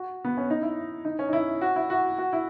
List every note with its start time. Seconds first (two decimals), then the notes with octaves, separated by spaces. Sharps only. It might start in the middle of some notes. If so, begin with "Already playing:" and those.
Already playing: F#4
0.25 B3
0.37 C#4
0.50 D#4
0.62 E4
1.05 D#4
1.19 C#4
1.29 D#4
1.33 E4
1.61 F#4
1.76 E4
1.90 F#4
2.18 F#4
2.33 E4